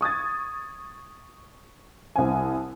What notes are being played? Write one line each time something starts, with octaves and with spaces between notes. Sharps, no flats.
C#6 D#6 G#6 A6
C2 C4 G#5